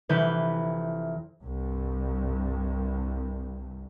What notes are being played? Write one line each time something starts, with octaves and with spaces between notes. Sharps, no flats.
F1 E3 B4 G6
C2 G2